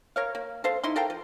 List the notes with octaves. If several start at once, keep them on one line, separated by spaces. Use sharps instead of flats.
A#4 C#5 F5
A#3
A4 C5 F5
D#4 E4 C6
A4 A#4 F5 G5
F3